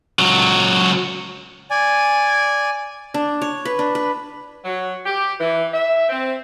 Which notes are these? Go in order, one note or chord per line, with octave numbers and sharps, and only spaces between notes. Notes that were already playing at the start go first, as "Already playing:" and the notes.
C#2 F#3
D5 G#5
D4
C#5
B4
D4
B4
F#3
G4
E3
E5
C4